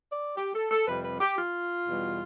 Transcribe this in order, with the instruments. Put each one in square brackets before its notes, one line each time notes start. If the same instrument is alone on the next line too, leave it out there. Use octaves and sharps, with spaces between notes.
[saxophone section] D5
G4
A4
A4
F2 C3 G3 B4
B4
G4
F4
E2 B2 G3